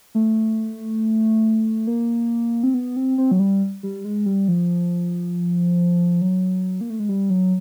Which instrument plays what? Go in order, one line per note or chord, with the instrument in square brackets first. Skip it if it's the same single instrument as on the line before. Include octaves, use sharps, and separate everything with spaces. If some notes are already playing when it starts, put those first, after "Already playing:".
[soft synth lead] A3
A#3
C4
B3
C4
C4
F#3
G3
G3
G#3
G3
F3
F#3
A#3
A3
G#3
G3
F#3